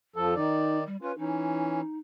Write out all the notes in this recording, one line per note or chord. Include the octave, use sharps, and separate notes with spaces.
F2 F3 A4
D#3 D#4 D5
G3
C#4 F4 B4
E3 C#4 D#4